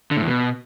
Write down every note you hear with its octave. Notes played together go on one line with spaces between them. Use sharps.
D3
A2
E2
B2